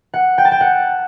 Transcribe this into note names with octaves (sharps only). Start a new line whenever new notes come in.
F#5
G5
A5
G5
F#5